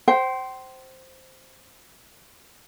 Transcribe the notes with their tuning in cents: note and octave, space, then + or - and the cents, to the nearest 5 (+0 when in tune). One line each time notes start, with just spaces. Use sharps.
C5 +0 G5 -35